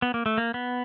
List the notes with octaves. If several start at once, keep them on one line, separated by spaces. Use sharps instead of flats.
B3
A#3
A3
A#3
B3